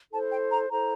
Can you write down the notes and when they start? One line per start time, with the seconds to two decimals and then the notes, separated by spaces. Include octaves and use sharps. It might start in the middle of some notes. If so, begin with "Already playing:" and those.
0.11 E4 A4 C5 A5
0.30 G5
0.50 A#5
0.69 E4 A4 C5 A#5